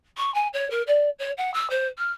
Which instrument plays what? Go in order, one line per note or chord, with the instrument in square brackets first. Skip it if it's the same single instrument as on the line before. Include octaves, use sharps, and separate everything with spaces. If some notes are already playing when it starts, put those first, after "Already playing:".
[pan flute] C#6
G#5
C#5
A#4
D5
C#5
F#5
E6
C5
F6